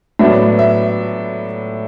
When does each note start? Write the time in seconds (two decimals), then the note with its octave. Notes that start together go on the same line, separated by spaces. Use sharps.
0.19 A2 F#3 B3 D4 E5
0.59 E5